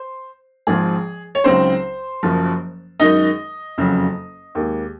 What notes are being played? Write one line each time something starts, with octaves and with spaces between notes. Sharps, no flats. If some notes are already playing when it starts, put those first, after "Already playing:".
Already playing: C5
G#1 G#2 F3 G#3 C4 G#4
C#5
C#2 C#3 F#3 C4 D#4 C5
F#1 F#2 F3
F#2 D#3 G#3 D#4 D#5
F#1 F2 C#3 F#3
D#2 D#3 G#3